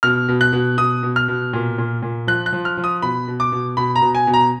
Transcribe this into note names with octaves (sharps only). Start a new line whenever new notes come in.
B2 F6
B2
F#6
B2
B2 D#6
B2
F6
B2
A#2
A#2
A#2
F3 F#6
F#6
F3
F6
F3
D#6
B2 B5
B2
D6
B2
B2 B5
A#5
B2
G#5
B2
A#5